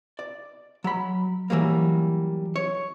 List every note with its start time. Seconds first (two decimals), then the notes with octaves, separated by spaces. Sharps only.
0.19 D5
0.84 F#3 B5
1.50 E3 F#3 G3 A#3
2.56 C#5